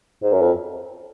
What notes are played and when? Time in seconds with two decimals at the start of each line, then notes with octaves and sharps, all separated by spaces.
0.22 G#2
0.32 F#2
0.42 F2